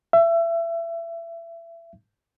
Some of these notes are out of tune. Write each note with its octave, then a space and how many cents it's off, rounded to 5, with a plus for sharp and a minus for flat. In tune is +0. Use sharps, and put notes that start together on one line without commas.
E5 +25